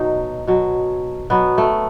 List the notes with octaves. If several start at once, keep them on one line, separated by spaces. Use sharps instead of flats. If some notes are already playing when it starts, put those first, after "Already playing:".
Already playing: B2 F#3 D#4
B2 F#3
B2 F#3 B3
A3